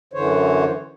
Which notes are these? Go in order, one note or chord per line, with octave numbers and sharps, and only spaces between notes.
F#2 D3 E3 C5 C#5